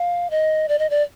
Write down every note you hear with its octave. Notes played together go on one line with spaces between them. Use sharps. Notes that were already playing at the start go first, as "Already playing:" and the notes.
Already playing: F5
D#5
D5
D#5
D5